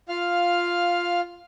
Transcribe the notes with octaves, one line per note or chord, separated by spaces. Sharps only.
F4 F5 F6